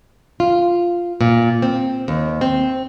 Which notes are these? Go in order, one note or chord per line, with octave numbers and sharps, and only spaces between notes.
F4
A#2
C4
D#2
C4